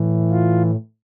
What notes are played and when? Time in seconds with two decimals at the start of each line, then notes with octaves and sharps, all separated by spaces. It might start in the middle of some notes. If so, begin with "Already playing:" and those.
Already playing: A2 E3
0.31 F4